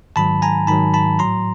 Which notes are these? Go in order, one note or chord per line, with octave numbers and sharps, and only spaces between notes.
G#2 D#3 F#3 A5 B5
G#5 A#5
G#2 D#3 F#3 A5 B5
A5 B5
A2 F#3 A#5 C6